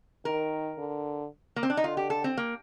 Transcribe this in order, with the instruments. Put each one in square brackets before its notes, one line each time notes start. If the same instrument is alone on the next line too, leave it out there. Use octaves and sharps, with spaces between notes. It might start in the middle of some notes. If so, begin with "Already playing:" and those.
[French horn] D#3 [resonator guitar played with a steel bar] A#4
[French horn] D3
[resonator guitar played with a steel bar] A#3
C4
D4
D#4
[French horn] D3 [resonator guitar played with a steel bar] F4
[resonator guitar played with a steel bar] G4
A4
C4
A#3